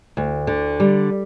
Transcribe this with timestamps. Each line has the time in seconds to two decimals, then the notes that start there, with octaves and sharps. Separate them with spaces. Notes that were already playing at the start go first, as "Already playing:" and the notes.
0.17 D2
0.47 D3
0.80 G3